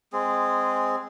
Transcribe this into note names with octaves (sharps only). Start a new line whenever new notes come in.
G#3 C4 G#4